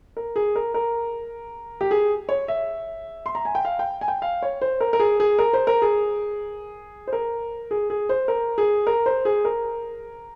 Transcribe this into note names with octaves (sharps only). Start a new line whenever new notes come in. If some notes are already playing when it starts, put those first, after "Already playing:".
A#4
G#4
A#4
A#4
G4
G#4
C#5
E5
C6
A#5
G#5
G5
F5
G5
G#5
G5
F5
C#5
C5
A#4
A#4
G#4
G#4
A#4
C5
A#4
G#4
C5
A#4
G#4
G#4
C5
A#4
G#4
A#4
C5
G#4
A#4